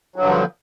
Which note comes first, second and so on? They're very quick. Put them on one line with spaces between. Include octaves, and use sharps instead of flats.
F#3 G2 D3 F3